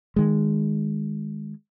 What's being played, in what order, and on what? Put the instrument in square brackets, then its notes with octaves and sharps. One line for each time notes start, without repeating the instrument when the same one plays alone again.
[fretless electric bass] D#3 G#3